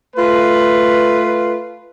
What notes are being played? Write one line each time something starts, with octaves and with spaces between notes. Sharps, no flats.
A3 F4 B4